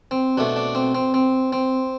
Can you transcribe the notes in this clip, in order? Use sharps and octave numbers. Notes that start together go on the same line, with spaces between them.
C4
B2 A3 D4
D4
C4
C4
C4
C4